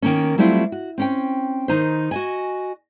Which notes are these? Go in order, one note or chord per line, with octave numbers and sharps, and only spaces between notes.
D#3 A#3 C#4
F#3 G3 A3 C4 E4 F4
F#4
C4 C#4 G5
D#3 D#4 C5
F#4 D#5 G#5